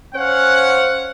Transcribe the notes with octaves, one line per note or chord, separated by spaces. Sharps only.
C#4 C5 F5 F#5